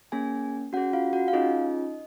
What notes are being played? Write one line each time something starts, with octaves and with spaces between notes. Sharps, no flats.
A#3 C#4 G#4 G#5
C#4 F#4 G#4 F#5
F4 F5
F#4 F#5
F5
C#4 D#4 F4 G#4 D#5